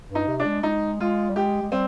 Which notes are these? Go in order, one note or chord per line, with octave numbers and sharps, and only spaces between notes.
G2
D#4
C3
D4
G#3
G#3 D#4
G#3 F4
G3
G#3 G4
G#3
G3 C4